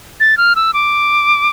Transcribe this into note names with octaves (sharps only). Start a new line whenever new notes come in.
A6
F6
E6
D6